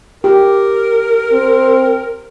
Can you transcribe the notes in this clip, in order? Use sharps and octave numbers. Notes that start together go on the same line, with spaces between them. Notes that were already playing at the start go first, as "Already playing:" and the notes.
G4 A#4
C4